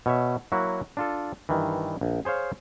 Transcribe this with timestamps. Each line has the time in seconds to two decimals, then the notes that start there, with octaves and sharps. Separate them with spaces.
0.06 B2 C#5 E5
0.52 F#3 A#3 E4 F#4
0.97 D4 F4 A4
1.49 G2 D#3 E3
2.01 A#1
2.25 G#4 C5 C#5 F5